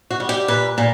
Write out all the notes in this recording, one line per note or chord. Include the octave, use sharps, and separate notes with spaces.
F#4
G3
G4
A#2 B4
A#2